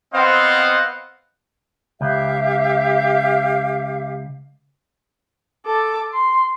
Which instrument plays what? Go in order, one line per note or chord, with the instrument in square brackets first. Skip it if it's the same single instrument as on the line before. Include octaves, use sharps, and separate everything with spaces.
[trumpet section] B3 C4 C5 D#5 F5 F#5
[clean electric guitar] C#2 [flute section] G4 E5 F5
[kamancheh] A4 D6
C6